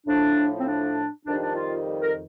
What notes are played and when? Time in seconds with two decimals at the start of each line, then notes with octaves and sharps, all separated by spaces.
0.07 A2 F3 D4
0.60 C4
0.67 D4
1.26 F2 D#3 G3 D4
1.42 D4
1.56 F4
2.01 A#4